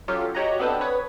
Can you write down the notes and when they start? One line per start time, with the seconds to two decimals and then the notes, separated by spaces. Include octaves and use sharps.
0.08 F#3 C#4 F4 G4 A4
0.35 F#4 G4 C#5 D#5 F#5 A#5
0.59 B3 C4 D4 A4 B4 C5
0.81 B4 C#5 D#6